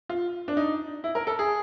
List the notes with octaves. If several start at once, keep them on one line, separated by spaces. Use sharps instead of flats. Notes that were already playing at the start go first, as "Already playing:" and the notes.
F4
D4
D#4
E4
A#4
A4
G#4